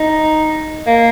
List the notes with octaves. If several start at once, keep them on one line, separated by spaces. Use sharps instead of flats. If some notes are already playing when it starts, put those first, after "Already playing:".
Already playing: D#4
A#3